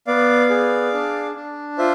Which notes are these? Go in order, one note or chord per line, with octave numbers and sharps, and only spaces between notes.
B3 D5 F5
G#4
D4
D4
F4 C5 E5